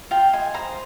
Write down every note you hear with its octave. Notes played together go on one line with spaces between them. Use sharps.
F4 G5
D#5 G#5
C5 A#5